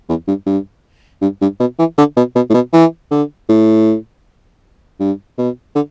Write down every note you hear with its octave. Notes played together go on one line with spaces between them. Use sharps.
E2
G2
G2
G2
G2
B2
E3
D3
B2
B2
A2
B2
E3
D3
A2
G2
B2
D3